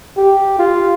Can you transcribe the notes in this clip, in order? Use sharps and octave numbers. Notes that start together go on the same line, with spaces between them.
G4
F4